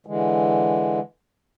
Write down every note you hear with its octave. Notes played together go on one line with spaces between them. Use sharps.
D3 E3 G#3